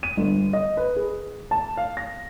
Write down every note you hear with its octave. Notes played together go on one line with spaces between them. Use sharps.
D#7
G1
D#5
B4
G#4
A5
F5
A#6